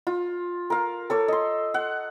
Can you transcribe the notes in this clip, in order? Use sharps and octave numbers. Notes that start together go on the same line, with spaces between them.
F4
A#4 F5
A4 C#5 D6
D#5 C6
F#5